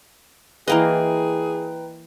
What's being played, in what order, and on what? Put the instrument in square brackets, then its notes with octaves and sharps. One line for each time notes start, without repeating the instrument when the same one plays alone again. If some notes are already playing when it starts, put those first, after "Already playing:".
[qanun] E3 A#3 D#5 [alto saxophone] G#4 [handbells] B4 G5 A#5